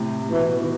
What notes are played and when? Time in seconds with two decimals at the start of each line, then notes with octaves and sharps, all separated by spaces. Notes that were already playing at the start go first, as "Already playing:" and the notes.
Already playing: A2 C3
0.31 B2 E3
0.61 D#3